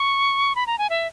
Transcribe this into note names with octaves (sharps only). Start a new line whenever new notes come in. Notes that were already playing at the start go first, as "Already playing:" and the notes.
Already playing: C#6
B5
A#5
G#5
E5